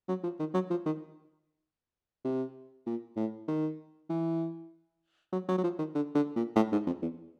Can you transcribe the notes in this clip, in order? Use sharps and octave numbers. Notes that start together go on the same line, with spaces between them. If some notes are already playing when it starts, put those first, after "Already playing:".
F#3
F3
D#3
F#3
F3
D#3
C3
A#2
A2
D#3
E3
F#3
F#3
F#3
F3
D#3
D3
D3
A#2
A2
G#2
F2
E2